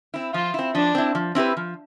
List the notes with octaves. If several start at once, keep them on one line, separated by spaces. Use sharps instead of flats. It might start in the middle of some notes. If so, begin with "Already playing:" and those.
C4 E4
F3 F4
C4 E4
F3 D4
C4 E4
F3
C4 E4 G4 B4
F3